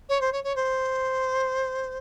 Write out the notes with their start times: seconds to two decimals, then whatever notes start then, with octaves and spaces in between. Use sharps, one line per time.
0.09 C#5
0.21 C5
0.32 C#5
0.44 C#5
0.56 C5